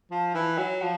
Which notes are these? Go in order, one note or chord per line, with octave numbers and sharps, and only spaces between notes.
F3
E3
F#3
F3